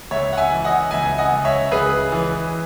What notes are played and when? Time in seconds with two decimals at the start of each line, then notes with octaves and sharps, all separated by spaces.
0.11 C#2 C#5 E5
0.33 F#5
0.37 E5 G#5
0.51 E3
0.65 D#5 F#5
0.91 C#2 E5 G#5
1.18 D#5 F#5
1.32 C#2
1.45 C#5 E5
1.71 C#2 G#4 B4
2.12 E3